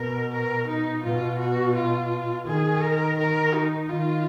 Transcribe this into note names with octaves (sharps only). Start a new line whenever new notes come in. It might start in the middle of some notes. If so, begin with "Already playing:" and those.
Already playing: B2 A#4
A#4
D#4
B2 F4
F#4
F4
D#3 G#4
A#4
A#4
D#4
D#3 F4